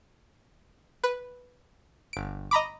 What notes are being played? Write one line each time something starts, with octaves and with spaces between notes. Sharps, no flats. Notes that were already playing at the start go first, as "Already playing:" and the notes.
B4
G1 D7
D#5 A#5 B5 D6